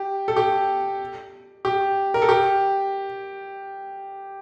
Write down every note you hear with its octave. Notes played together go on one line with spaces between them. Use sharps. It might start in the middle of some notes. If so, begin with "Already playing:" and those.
Already playing: G4
A4
G4
G4
A#4
A4
G4